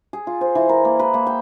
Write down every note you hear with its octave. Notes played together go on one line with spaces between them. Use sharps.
G#4
F4
C5
E3
A#4
A#3
B4
A#3
G5